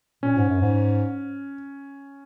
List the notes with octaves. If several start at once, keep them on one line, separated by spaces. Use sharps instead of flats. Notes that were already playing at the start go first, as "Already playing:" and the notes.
A#2 C#4
G#2
F#2
G#2